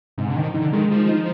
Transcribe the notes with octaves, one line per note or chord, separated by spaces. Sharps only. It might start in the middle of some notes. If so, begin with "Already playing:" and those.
G#2 C3
D3
D#3 F3
D3 D#4
D#3 G#3
F3 G#3
D#4